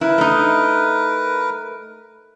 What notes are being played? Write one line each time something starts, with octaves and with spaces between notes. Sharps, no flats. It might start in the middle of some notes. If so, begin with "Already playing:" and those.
E4 A#4 B4
A3 D#4